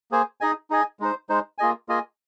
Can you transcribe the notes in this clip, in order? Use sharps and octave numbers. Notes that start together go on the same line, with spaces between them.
A#3 G#4 C5 G#5
D#4 G#4 D#5 G#5
D#4 G#4 D#5 G#5
G#3 D#4 C5
G#3 D#4 C5
A#3 F4 G#4 D#5 G#5
A#3 F4 G#4 D#5 G#5